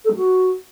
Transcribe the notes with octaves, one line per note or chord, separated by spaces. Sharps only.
A4
G3
F#4